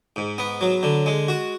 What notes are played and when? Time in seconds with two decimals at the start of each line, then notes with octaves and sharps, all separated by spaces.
0.16 G#2
0.38 B3
0.61 F#3
0.83 D3
1.06 G#3
1.28 F#4